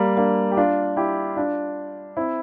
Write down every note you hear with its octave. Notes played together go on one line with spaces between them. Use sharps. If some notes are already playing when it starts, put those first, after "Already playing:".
Already playing: G3 A#3
A#3 D4
G4
D4 F4
E4 G4
D4 F4
C4 E4